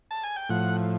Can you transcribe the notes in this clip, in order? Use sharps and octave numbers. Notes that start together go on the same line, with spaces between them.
A5
G#5
G5
A2 F3 F#5